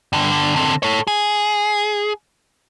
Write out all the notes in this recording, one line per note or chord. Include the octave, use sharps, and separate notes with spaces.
G2 D3
D3 C4
A4 C#5
G#4